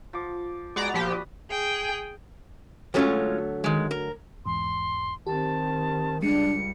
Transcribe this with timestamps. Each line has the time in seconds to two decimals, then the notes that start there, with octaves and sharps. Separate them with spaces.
0.13 F3 D6
0.76 G#3 B3 F#4 D5 A#5
0.94 A#2 F3 G4 B5
1.09 G3 D#6
1.52 G#4 G5
2.94 D2 F#3 G#3 A3 C#4 F4
3.64 D#3 G#3
3.91 A#4
4.46 E2 G#2 C6
5.27 D#3 C4 G4 A5
6.22 C#2 G3 G#3 D4 C#7